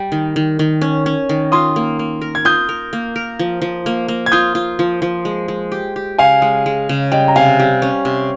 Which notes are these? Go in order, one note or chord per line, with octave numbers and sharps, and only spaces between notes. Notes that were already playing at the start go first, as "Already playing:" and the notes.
Already playing: G3 G5
D#3
D#3
D#3
C#4
C#4
D#3
F4 C6 D#6
A#3
A#3
A#4
G#6
F4 D#6 G6
A#4
A#3
A#4
F3
F3
A#3
A#3
G#6
F4 D#6 G6
F4
F3
F3
G#3
G#3
G4
G4
C#3 F5 G#5
G#3
G#3
C#3
G3 D#5 G5
A#5
C3 F5 G#5
G3
C#4
C3